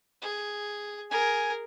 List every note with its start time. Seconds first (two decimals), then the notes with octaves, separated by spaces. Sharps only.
0.21 G#4
1.11 G#4 A#4 G#5